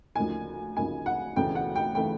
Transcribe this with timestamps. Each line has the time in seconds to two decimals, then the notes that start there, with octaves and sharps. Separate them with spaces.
0.16 D2 C#3 F3 A#3 D#4 G#5
0.76 D2 C#3 F3 A#3 D#4 G#5
1.06 F#5
1.36 E1 D2 C#3 E3 A3 G5
1.55 F#5
1.76 G5
1.95 C#3 E3 A3 G5